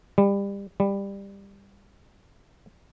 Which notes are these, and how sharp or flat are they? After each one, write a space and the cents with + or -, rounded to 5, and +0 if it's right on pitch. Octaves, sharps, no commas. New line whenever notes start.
G3 +25
G3 +15